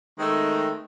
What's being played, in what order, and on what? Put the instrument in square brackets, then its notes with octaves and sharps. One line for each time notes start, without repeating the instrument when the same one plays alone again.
[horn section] D#3 G#3 A3 C4 D#5